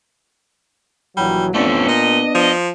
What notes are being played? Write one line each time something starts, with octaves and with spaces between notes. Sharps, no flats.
A#1 E3 F#3 G3
F2 A3 B3 C#4 D4
A#2 D#5
F3